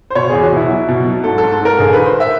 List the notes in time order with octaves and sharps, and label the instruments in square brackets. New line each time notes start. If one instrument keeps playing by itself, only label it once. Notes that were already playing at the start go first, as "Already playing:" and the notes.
[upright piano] C5
B2 C#5
E2 G#4
F#4
B2 E4
F#3
B2
F#3
G#2 A4
A4
G#2
A4
G#2 A#4
A#1 G#4
D#3 B4
C5
E5